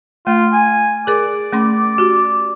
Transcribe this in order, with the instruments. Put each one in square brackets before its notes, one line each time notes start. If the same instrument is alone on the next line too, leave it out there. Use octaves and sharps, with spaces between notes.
[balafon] A3 [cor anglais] F4
[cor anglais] G#5
[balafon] G#4 A#4 [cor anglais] D5
[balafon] A3 C#4 C6
F#4 G4